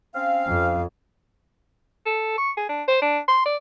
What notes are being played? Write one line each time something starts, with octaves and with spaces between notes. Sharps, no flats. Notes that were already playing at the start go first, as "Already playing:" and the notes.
C4 C#4 F5
F2
A4
C#6
G#4
D4
C5
D4
C6
D5